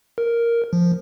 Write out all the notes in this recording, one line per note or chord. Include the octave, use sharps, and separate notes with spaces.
A#4
F3